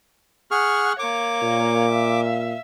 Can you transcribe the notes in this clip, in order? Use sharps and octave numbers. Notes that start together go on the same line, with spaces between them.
G#4 F#5 C#6 F6
A#3 C#5 D6
A#2
E5 F5